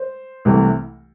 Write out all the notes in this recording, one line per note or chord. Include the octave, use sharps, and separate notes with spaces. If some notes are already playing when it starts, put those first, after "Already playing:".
Already playing: C5
C2 C3 E3 A3